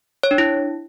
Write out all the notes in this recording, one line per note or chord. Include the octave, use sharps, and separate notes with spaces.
C#5
D4
E4